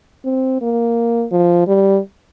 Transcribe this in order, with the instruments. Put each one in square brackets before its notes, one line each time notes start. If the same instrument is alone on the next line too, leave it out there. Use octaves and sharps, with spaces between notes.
[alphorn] C4
A#3
F3
G3